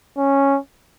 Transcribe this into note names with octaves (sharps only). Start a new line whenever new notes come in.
C#4